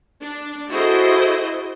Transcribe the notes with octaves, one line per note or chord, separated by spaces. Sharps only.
D4
E4 F#4 G#4 A4 C5 D#5